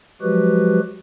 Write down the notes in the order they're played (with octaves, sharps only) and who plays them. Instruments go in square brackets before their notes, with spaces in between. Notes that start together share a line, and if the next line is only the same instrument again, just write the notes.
[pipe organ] F3 F#3 G#3 F#4 G4 B4